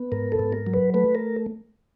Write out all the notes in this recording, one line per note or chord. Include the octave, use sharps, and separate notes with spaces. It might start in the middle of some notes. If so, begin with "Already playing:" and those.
Already playing: B3
G#2 A#4
A4
G#2
A#4
F#3
B4
A3 B4
A#4